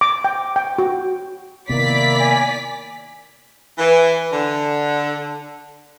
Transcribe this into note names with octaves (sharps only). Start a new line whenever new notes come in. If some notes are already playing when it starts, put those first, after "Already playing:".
D6
G5
G5
F#4
C3 D#3 A#3 B3 E4 D5 B6
G#5
E3
D3